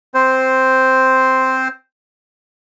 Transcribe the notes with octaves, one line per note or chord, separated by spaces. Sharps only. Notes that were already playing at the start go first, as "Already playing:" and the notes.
C4 C5